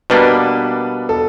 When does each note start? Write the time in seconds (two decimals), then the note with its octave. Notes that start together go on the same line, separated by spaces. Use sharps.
0.10 B2 G3 A#3 B3 D4 B4
1.09 A4